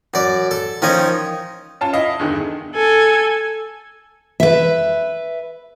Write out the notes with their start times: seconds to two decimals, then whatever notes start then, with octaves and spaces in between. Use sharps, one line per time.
0.14 F#2 D5
0.51 A4
0.82 D#3 F3 C#4 C#5 D#5
1.81 C#4 F4 A5
1.93 E4 D#5 F5
2.19 E2 G2 D3 D#3
2.75 A4 G#5
4.40 B4 E5